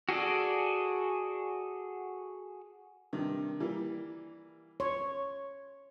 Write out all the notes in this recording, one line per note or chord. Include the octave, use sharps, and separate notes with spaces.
F#4 G#4 A4 D5
G2 C3 D#3
E3 G3 A#3
C#5 C6